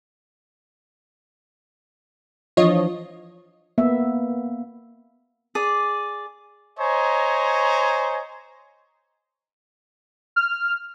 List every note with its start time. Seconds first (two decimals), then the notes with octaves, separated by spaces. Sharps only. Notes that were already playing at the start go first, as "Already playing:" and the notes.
2.57 E3 F3 D4 F4 C#5 D#5
3.78 A#3 B3 E5
5.55 G#4 D5
6.79 C5 C#5 D#5 G#5 A#5
10.36 F6